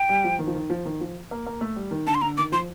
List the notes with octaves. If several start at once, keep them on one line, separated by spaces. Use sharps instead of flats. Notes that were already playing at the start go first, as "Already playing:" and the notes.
Already playing: G5
G3
F3
D#3
F3
D#3
F3
D#3
F3
A#3
A#3
A3
G3
D#3
D3 A5
C6
D3 A#5
D#3 D6
F3 C6